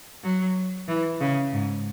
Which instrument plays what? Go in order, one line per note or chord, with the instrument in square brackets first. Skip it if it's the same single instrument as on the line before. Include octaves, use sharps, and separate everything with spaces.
[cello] F#3
E3
C#3
G#2